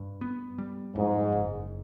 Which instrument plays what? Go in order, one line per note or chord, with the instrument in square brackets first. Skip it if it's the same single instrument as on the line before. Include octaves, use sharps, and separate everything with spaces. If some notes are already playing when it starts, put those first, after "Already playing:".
Already playing: [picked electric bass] G2
B3
G3
[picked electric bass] F2 [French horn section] G#2
[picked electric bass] F#1